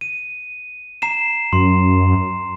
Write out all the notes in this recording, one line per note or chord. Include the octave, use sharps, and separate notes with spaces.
D#7
A#5 C7 E7
F#2 C6